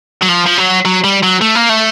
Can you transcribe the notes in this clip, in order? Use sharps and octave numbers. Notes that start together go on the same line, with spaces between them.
F#3
F3
F3
F#3
F#3
G3
F#3
A3
A#3
A3